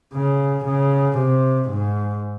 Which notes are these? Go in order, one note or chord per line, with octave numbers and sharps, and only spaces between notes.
C#3
C#3
C3
G#2